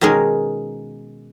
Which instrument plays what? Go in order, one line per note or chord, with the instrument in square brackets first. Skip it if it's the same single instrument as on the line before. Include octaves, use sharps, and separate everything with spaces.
[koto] B2 D#3 G#3 C#4 G#4 A#4